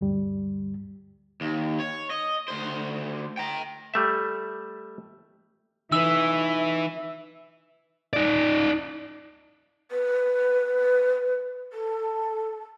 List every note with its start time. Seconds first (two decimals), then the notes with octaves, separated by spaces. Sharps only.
0.01 D2 G2 G3
1.41 D#2
1.80 C#5
2.10 D#5
2.48 D2 C5
3.37 G5 A#5
3.94 G3 A3 E5
5.92 E3 D#4 B4 E5 E6
8.13 D#4 D5
9.91 B4
11.73 A4